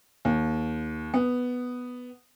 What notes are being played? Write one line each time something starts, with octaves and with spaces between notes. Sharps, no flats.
D#2
B3